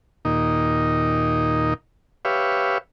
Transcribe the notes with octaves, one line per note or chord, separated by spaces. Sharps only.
D#2 A#2 D#4
G4 B4 C#5 E5 F5